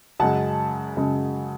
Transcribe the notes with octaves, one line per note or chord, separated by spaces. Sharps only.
F#2 C#3 G#3 F#5 A5
F#2 C#3 G#3